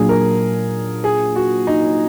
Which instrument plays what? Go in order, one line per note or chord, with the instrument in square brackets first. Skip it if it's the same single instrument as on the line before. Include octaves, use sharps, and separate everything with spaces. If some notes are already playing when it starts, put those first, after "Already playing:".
Already playing: [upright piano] A#2 F#3 D4 F4 [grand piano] G#4
[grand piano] A#4
G#4
F#4
D#4